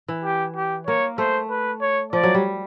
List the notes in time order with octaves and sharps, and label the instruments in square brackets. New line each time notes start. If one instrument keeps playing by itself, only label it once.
[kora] E3
[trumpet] G4
G4
[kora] A#3 [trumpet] C#5
[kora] A3 [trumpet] C5
[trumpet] B4
C#5
[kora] F3 [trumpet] D5
[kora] F#3
G3